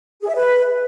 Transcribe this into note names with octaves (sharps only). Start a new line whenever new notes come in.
G#4
E5
B4